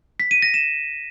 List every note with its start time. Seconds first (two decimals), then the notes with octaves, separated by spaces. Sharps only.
0.20 B6
0.31 D#7
0.42 A#6
0.54 E7